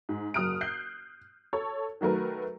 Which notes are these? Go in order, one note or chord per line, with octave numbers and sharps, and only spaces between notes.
G#2
F#1 F#3 D#6 F6 F#6 D7
F#6 G6 C7
A4 C#5
D#3 F#3 A3 A#4 B4